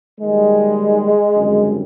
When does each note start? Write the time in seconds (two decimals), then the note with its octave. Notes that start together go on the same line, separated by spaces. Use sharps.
0.20 D#2 D#3 G3 G#3
1.35 G#1 F#2 D3 G3